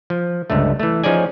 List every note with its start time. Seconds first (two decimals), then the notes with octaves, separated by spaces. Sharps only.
0.10 F3
0.50 C#2 G2 D3 A3
0.80 E3 A3
1.04 F3 C#4 D#4 G#4 D5 G#5